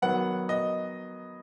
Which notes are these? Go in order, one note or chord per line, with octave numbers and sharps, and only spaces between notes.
D#3 F#3 B3 F#5
D#5